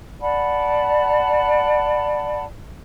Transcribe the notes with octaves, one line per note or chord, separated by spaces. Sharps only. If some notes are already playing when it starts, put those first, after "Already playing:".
D5 F#5 A5 B5